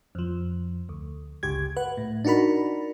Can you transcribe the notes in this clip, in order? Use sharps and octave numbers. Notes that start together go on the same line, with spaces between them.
F2 F3
D2
G1 C#2 G4 G#6
B4 F#5
A2
D4 D#4 F#4 A#4 B5